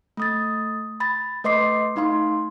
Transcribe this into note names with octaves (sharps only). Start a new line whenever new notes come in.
A3 D#6 A6
B5 A6
A3 B4 D#5 C6 D6 C7
A3 D#4 F5 C6